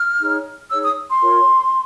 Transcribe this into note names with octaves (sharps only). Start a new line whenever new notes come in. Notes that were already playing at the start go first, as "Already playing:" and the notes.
Already playing: F6
D#4 G#4 C#5
D#4 G#4 C#5 E6
D#6
C6
F4 A#4 C#5